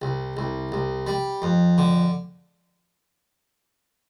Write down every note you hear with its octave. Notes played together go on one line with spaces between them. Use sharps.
C2
C2
C2
G3
F2
D3